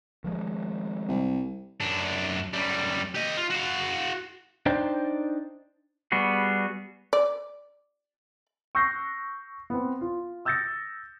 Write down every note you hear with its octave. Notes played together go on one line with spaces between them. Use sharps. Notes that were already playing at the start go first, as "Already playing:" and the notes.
D#3 F3 G#3
C2
F#2 D4
F#2 G3
G4 D#5
F4
F#4 F5
D4 D#4 C5 D5 G5
G3 B3 F#4 G#4
D5
C#6 E6 F#6 G6 A#6 C7
B3 C4
F4
D#6 E6 G6 A6 A#6 C#7